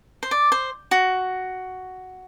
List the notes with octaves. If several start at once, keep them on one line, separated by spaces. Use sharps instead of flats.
C5
D5
C5
F#4